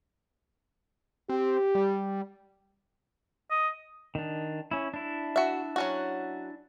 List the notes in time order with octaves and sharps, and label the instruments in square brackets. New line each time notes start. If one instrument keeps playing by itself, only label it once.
[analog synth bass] C4 [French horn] G4
[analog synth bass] G3
[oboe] D#5
[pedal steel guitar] D#3 D4
C#4 E4
D4 E4
[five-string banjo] F#4 E5
F#3 C#4 F#4